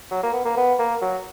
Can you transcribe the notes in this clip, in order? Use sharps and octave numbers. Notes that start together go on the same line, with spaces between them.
F#3
A#3
B3
A#3
B3
A#3
F#3